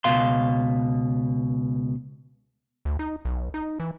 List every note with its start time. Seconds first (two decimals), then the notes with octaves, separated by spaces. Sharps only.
0.04 C#2 B2 F5 C6
2.85 D2
2.99 D#4
3.25 B1
3.54 D#4
3.80 E3